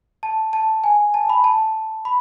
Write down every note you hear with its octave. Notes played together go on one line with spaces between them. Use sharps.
A5
A5
G#5
A5
B5
A5
B5